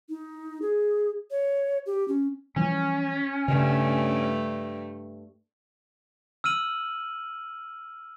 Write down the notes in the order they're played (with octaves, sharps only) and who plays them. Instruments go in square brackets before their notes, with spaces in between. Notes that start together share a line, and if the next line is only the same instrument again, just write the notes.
[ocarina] D#4
G#4
C#5
G4
C#4
[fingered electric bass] E3 F3 G3 [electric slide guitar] C#4
[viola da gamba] G2 A3 [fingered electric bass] C#3
[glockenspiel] E6 F6 D#7 F#7